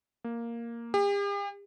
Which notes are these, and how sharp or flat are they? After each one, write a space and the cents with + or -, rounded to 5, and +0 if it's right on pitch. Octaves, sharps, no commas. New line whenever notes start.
A#3 +0
G4 +45